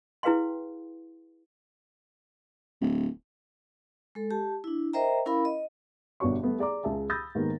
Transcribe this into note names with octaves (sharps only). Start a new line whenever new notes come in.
E4 G#4 B4 F5 G5 C6
D1
G#3 A4
G4 A5
D4 E4
A#4 C5 D#5 E5 G5 A#5
C#4 E4 A#4 F5 B5
D#5
G1 B2 D4 F#4 C#5 C#6
G3 A3 B3
G#4 D5 A#5 D6
C#2 G#4 E5 A5
B5 D#6 E6 G6 A6 A#6
G#2 D#3 A#3 B3